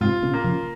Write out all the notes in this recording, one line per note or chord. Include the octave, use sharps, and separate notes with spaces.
G#2 C3 F4
A#2 C#3
A#3
C#3 F3